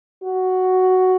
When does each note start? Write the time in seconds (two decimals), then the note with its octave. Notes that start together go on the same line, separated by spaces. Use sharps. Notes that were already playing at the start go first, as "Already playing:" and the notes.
0.24 F#4